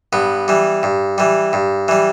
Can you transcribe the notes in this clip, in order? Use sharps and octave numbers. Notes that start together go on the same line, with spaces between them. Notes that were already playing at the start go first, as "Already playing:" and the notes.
G2 B3
E3 G3
G2
E3 G3
G2
E3 G3